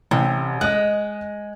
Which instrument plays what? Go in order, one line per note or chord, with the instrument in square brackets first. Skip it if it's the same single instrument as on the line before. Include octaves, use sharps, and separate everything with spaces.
[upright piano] A1 [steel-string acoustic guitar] C3
[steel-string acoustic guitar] G#3 [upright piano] D#5 F#6